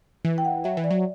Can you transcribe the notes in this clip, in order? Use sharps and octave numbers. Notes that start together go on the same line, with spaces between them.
E3
G5
F#5
F#3 E5
E3
D5
F#3